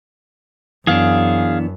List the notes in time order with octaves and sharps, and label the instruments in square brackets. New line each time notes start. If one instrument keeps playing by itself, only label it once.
[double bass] F#2 [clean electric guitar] E3 B3 D4 [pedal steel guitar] G#4 F5